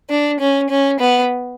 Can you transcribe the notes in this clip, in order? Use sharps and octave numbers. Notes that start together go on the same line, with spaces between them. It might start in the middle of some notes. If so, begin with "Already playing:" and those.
D4
C#4
C#4
B3